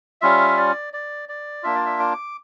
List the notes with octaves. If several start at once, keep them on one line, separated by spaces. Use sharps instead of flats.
G3 C#4 F4 E5
D5
D5
D5
A#3 D4 F4 E5
D5
E5
D6